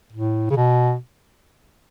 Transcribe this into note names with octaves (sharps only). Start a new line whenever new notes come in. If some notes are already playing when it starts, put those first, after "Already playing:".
A2
C#3
B2